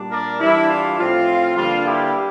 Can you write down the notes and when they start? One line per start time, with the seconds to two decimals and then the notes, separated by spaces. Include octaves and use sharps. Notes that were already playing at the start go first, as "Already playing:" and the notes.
Already playing: A#2 G3 D4
0.11 A#4 D5
0.40 E3 G3 D4 E4
0.69 F4
0.98 A2 F3 C4 F4
1.56 G2 D3 G3 A#3 D4 F4
1.85 E4 G4